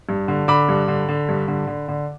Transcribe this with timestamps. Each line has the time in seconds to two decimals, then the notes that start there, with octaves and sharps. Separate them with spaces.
0.09 G2
0.28 D3
0.48 D3 B5 D6
0.69 G2
0.88 D3
1.09 D3
1.29 G2
1.48 D3
1.67 D3
1.88 D3